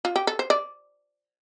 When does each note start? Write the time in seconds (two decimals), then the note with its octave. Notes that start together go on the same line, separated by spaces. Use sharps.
0.05 F4
0.16 G4
0.27 A4
0.39 C5
0.50 D5